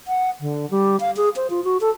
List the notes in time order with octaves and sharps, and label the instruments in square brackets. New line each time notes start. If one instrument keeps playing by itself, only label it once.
[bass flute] F#5
D3
G3
F5
G#4
C5
F4
F#4
A4